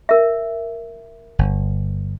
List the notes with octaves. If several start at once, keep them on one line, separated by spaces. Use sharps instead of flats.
A#4 E5
G1